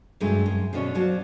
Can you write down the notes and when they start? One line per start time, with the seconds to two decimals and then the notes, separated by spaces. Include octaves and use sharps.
0.20 G2 C3 F#3 G#3 A3
0.46 F#2
0.73 B2 D3 C#4 D4 C#5
0.95 F3 F#3 F#4 D5 A5